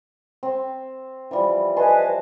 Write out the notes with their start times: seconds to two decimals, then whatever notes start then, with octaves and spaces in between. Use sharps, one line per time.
0.43 C4
1.31 E3 F3 G3
1.77 B4 D#5 G#5 A5 C6